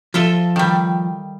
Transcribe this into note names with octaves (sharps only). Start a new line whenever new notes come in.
F3 F4 A4 E5
D#3 G3